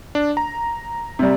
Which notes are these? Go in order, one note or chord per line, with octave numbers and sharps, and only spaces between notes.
D4
A#5
C3 G3